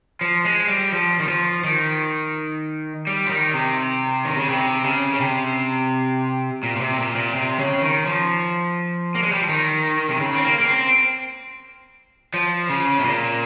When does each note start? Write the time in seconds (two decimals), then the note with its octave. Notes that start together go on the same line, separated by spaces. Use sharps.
0.21 F3
0.45 G#3
0.68 G3
0.92 F3
1.20 D#3
1.28 F3
1.64 D#3
3.07 G3
3.27 F3
3.31 D#3
3.54 C3
4.25 D#3
4.37 C#3
4.49 C3
4.85 C#3
5.14 C#3
5.20 C3
6.63 A#2
6.76 A#2
6.81 C3
6.99 A#2
7.16 A#2
7.35 C3
7.59 C#3
7.82 D#3
8.06 F3
9.15 A#3
9.23 G#3
9.31 G3
9.40 F3
9.49 D#3
10.09 C3
10.20 C#3
10.35 C4
10.44 A#3
10.59 A#3
10.67 C4
12.34 F3
12.69 C#3
13.00 C3
13.05 A#2